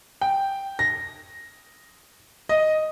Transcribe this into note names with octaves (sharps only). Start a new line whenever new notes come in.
G5
A#6
D#5